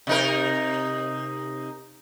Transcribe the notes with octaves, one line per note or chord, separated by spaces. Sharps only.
C3 D#4 A#4